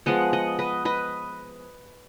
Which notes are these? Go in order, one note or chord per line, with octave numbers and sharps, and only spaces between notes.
F3 G#3 B3 D#5 F#5
D#5 F#5
B4 D#5
B4 D#5